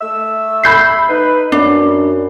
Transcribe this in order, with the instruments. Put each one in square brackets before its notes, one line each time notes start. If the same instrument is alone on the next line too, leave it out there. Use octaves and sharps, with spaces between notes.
[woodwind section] A3 E6
[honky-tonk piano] B5 G6 C7
[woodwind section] D#4 B4
[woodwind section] F#2 [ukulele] D4